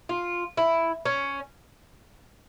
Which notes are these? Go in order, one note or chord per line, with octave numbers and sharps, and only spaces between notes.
F4
E4
C#4